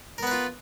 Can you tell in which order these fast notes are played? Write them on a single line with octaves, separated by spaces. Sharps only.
A#4 B3 B4 F4